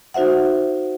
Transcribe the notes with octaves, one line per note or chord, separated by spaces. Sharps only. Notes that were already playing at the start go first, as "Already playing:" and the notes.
D#4 F#4 C5 E5 F#5